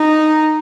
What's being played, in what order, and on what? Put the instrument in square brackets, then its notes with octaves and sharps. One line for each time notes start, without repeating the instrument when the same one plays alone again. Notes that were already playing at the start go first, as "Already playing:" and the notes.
Already playing: [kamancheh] D#4